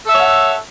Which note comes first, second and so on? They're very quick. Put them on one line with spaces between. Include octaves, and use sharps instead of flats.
A4 E5 C#5 F#5